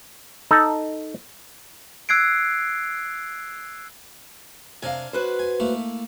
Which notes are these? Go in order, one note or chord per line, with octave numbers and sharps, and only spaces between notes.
D#4 A4
E6 F#6 G#6 C7 D7
C3 D4 A#4 F5 G#5
F#4 B4 C5
G#5
A3 A#3 E4